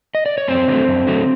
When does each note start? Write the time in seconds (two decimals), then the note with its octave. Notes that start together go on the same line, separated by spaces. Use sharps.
0.15 D#5
0.26 D5
0.38 C#5
0.48 F#2 C4 C5
0.67 D3 F#3 A3
0.88 F#2
1.07 D3 F#3 A3